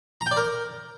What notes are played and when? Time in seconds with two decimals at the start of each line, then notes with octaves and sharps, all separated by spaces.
0.21 A#5
0.26 G5
0.31 D5
0.37 A#4